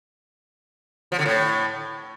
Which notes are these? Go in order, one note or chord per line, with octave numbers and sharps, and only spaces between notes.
F3
D3
A2